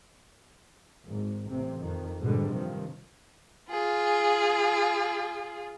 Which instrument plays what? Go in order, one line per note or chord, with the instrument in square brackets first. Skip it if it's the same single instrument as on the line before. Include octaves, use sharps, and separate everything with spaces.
[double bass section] G#1 G#2
A1 C3 C4
F2 D#3
G#2 B2 D3 G3
G2 C3 D#3 F3
[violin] F4 G#4